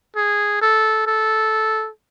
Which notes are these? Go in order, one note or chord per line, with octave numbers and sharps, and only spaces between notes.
G#4
A4
A4